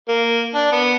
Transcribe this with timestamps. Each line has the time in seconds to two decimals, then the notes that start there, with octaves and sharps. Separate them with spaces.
0.08 A#3
0.55 D4
0.72 B3